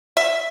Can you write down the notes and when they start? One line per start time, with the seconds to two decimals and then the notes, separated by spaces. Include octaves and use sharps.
0.17 E5